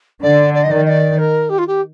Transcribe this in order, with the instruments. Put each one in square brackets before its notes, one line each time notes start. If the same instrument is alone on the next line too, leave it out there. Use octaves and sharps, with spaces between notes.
[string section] D3 [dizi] D5
[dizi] D5
D#5
[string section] D#3 [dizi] D5
[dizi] D#5
D5
A#4
G4
F4
G4